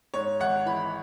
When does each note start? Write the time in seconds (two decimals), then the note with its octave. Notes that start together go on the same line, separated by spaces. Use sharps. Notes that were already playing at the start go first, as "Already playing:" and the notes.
0.14 G#2 C#5
0.40 G#1 F#5
0.66 E3 B5